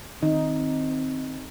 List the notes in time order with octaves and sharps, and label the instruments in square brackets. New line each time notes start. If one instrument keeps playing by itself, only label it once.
[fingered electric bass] D#3 [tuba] C4 [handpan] D#4